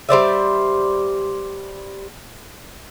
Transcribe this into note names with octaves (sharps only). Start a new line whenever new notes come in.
G3 C5 D5 E5